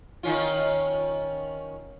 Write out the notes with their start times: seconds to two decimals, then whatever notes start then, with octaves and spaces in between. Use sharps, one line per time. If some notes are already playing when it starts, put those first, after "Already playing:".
0.23 D#3 C#4 F4